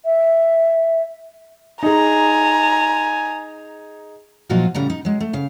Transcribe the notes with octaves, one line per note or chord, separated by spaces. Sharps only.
E5
D#4 G#4 G#5 A#5
A#2 F3 F#3 D#4 F4 F#4
A2 C#3 G3 A#5
D#4
F#3 G#3
A3
C#3 F5